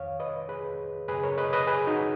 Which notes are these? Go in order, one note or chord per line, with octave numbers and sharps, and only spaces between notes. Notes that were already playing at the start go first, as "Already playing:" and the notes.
Already playing: F2 D#3 C#5 F5
B4 D#5
G#4 B4
F#2 C#3 G#4 B4
A#4 C#5
B4 D#5
B4 D#5
G#4 B4
D#4 F#4